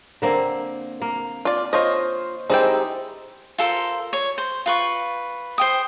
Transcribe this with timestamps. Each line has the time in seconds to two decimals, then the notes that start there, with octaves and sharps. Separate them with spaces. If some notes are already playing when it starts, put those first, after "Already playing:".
0.22 D3 A#3 C4
1.02 A#3
1.45 F4 D5
1.73 F4 C5 C#5 D#5
2.50 G#3 C4 D#4 E4 G4 D5 G5
3.58 F4 A4 A#4 C5
4.13 C#5
4.38 C5
4.66 F4 B4 C#6
5.58 C5 G5 D#6